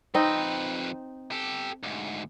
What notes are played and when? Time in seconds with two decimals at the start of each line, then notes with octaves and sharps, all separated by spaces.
0.14 F2 C4 D#4 B4
1.32 G4 A4
1.83 D2 G#2